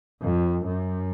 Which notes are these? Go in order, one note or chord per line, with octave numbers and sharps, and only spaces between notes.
F2
F#2